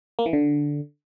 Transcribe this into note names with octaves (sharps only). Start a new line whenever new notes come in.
A#3
E3
D3